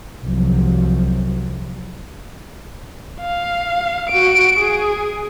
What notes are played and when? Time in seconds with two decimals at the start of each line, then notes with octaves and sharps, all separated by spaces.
0.24 C2 F3 F#3
3.20 F5
4.09 F#4 D7
4.59 G#4